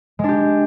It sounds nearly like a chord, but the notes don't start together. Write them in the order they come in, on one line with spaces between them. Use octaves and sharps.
G#3 D4 G4